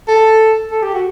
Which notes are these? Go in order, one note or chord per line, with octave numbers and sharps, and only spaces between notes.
A4
A4
G4
F#4